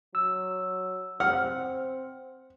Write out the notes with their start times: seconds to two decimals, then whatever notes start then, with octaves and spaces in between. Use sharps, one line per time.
0.15 F#3 E6
1.20 C4 F#5 F6